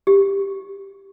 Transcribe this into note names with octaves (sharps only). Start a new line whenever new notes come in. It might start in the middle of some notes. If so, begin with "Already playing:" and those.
G4